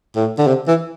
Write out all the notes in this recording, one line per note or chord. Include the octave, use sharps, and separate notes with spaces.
A2
D3
C3
E3